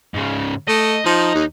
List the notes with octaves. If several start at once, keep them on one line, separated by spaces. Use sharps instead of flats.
G#2 C#3
A3 D#5
F3 D#4
D#2